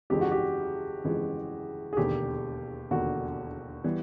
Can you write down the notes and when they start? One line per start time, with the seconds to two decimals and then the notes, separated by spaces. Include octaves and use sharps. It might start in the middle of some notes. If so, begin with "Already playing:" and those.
0.10 G1 F2 C#3 E3 G#3 G4
0.21 F#4
0.32 G4
1.04 G1 F2 C#3 E3 G#3
1.93 G#4
1.97 E1 D#2 D3 G4
2.91 E1 D#2 D3 F#4
3.84 E3 G3 B3